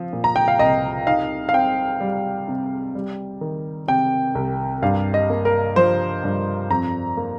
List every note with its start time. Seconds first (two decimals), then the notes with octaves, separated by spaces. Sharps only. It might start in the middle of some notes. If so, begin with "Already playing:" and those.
Already playing: F3 C4
0.13 A#2
0.24 A#5
0.36 G5
0.48 F5
0.59 C2 D#5
1.07 D#4 F5
1.49 F5
1.53 C4 G5
2.00 G3
2.48 C3
2.95 G3
3.41 D#3
3.88 C3 G5
4.35 C2
4.82 G2 F5
5.14 D#5
5.30 A#3
5.45 A#4
5.76 F3 C5
6.24 G2
6.70 F2 A#5
7.17 A#3